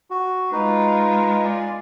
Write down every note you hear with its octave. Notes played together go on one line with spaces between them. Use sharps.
F#4
G#3 D#4 F4 B4
D5 G#5